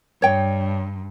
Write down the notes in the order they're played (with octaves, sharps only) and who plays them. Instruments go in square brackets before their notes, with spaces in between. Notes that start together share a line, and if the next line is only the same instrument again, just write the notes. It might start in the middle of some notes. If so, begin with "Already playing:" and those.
[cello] G2 [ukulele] C#5 G5